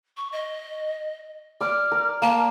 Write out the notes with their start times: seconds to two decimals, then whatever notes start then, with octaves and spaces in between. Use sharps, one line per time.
0.17 C#6
0.32 D#5
1.61 D5 D6 F6
1.92 A#4
2.22 A#3 A5